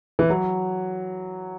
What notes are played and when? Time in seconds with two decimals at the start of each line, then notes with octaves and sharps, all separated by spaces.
0.19 E3
0.30 F#3